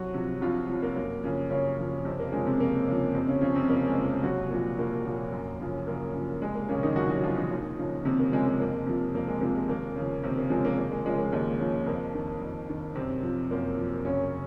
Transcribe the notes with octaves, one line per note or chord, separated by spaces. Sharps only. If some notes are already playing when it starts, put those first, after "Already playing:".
Already playing: C2 F#3 F#4
C3 F3
C2 F3 F4
C3 F3
A#3
F#2 A#3
C#3 F3
F#2 C#3 C#4
C#3 F3
F2 C3 C4
A#3
C#3 F3 G#3
C3 C4
F2 A#3
C#3 F3
F2 C3 C4
C#3 C#4
C#3 F3 C#4
C3 C4
F2 A#3
G#3
C#3 F3
A#3
C2 F#3 F#4
A#2 F3
C2 A#3
A#2 F3
F#2
C#3 F3
F#2 A#3
C#3 F3
C2 G#3
A#3
A#2 C#3 F3 C#4
D#3 D#4
C2 F#3 F#4
F#3 F#4
A#2 F3 F4
D#3 D#4
D#2
C#3 F3
D#2 C3 C4
A#3
C#3 F3 G#3
G#3
F2 A#3
C3 F3
F2 A#3
G#3
C3 F3 A#3
G#3
D#2 A#3
C#3
F3
D#2 C3 C4
A#3
C#3 F3 G#3
A#3
D#2 A#3
G#3
C#3 F3 G#3
A#3
D#2 G#3
C#3 F3
F2 A#3
D#3
F2
D#3
F#2 C3 C4
F3
F#2 A#3
F3
F#2 C#3 C#4